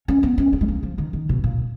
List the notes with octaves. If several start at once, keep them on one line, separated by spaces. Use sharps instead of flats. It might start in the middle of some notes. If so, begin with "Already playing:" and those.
C#4
B3
C#4
B3
G#3
A#3
F3
D#3
D#3
B2
A#2